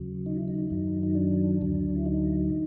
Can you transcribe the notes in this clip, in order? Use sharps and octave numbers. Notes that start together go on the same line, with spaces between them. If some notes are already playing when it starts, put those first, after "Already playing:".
Already playing: D#2 C#3 F#3
D#4
E4
D#4
F#2 D#3 F#3
D#4
D4
D2 D3 F#3
E4
D#4